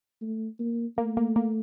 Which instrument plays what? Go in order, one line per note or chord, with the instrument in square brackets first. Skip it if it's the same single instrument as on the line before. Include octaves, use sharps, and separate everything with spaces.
[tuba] A3
A#3
[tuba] A3 [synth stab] A#3
[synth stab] A#3
A#3